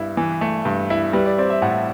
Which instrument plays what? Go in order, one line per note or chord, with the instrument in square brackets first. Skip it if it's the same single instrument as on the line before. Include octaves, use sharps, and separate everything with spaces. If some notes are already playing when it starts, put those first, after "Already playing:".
Already playing: [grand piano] G2 E4
E3
A3
G2
E4
[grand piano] G3 [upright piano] B4
[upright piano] D5
[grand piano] C4 [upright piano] D5
[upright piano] E5
[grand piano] A2 [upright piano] F#5